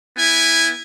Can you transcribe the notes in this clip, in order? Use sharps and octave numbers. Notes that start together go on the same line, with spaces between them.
B3 E4 G#5